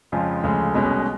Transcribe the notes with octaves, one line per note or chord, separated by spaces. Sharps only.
F2 C#3 F3 G#3
D2 C#3 F3 G#3
C2 B2 G#3 C#4